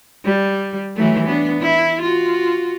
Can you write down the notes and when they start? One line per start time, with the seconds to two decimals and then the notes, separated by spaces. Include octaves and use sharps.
0.25 G3
0.95 E3 F#3 A3
1.27 B3 D4
1.61 E4
2.02 F4 F#4